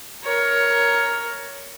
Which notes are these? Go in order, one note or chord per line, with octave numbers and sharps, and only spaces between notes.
A#4 C#5